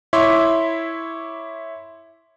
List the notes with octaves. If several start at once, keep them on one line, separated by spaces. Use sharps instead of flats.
E4 C#5 E5 C6 D6